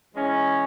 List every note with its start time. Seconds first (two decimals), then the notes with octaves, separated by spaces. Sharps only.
0.15 E3 G#3 C#4